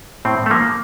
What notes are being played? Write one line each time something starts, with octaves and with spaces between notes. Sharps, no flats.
A2 C4
A3
F3 A#3